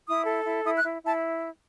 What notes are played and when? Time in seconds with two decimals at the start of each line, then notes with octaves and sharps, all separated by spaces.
0.07 E4 D#6
0.25 A4
0.45 E4
0.64 E4 D#6
0.77 F#6
0.83 E4
1.02 E4 A5